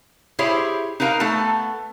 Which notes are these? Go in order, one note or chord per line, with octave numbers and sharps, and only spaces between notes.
E4 G4 G#4 C5 C#5 E5
D#4 A#4 B4 F5 A#5
A3 B3 A4 A5